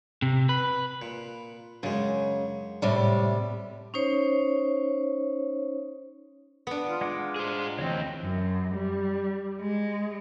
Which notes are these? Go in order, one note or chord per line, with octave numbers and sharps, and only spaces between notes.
C3
B4
A#2
F#2 C#3 G#3
A2 C3 G3
C#4 D#4 C5 C#5
B3 D4
F4
G#3 F#5 D6
G#4 C5
D2 E3 C4 C#5 D#5
F#2
G3
G#3